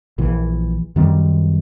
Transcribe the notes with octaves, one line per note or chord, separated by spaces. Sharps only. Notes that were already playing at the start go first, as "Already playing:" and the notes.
A#1 E3
F#2 D#3 G3 C4